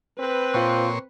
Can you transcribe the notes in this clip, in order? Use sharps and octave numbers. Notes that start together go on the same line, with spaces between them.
C4 B4
A#2 F4 C5 C#5 G5 C6